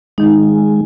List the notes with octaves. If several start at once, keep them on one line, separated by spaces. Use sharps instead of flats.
D#3 G#3 D#4